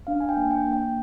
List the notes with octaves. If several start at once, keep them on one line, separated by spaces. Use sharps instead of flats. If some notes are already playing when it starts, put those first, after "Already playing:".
D4 F5
G#5
G5
A#3
G5
A#3
G5